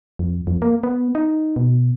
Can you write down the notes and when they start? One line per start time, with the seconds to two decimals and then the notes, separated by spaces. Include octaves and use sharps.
0.19 F2
0.47 F2
0.62 A#3
0.83 B3
1.15 D#4
1.56 B2